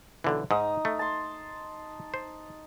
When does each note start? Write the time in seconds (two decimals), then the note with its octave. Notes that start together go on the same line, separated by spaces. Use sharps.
0.24 B1 D3 E3
0.51 G#2 D#4 D#6
0.85 A3
0.99 A5 C6
2.14 C5